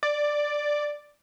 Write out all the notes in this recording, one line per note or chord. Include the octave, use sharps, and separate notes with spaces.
D5